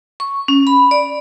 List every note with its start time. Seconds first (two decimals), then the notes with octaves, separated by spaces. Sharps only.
0.20 C#6
0.48 C#4
0.67 B5
0.91 D5